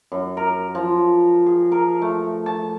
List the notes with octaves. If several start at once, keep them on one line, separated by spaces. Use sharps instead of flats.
F#2
A#4
F3
G#4
A#4
A3
A5